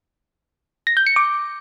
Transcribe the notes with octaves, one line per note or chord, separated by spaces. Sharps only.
A#6
G6
C#7
D6